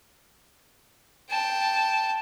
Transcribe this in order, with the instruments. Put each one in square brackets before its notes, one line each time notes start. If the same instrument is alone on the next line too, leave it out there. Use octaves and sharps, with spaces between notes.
[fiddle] G5 A5